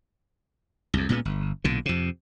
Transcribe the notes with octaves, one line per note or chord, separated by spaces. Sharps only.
C2 F2
C#2 A#2 C#3 B3
G1
B1 A#2 D3
F2 C3